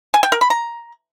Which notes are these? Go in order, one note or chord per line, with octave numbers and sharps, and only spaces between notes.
G#5
G5
A#4
B5
A#5